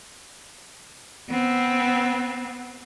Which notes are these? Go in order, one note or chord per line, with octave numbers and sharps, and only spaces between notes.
B3 C4